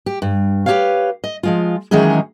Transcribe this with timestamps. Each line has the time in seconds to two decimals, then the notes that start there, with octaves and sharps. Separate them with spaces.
0.06 G4
0.22 G2
0.66 G4 G#4 B4 C#5 F5
1.24 D#5
1.43 F3 G#3 F4
1.91 D#3 E3 F#3 G#3 C#4 G#4